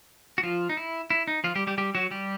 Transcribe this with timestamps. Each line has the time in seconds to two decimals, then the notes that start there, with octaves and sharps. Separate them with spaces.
0.38 F#4
0.43 F3 F4
0.69 D#4
0.77 E4
1.10 E4
1.27 D#4
1.44 F3 F4
1.55 G3 G4
1.67 G3 G4
1.78 G3 G4
1.95 F#3 F#4
2.11 G3 G4